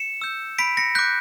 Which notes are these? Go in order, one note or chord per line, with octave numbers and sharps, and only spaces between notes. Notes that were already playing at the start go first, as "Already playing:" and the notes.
Already playing: C#7 E7
E6 G6
B5 B6 D7
A#6 C#7
D6 F#6 G6 B6